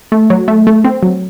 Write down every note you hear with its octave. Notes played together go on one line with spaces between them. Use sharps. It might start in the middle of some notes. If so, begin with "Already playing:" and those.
A3
F#3
A3
A3
C4
F#3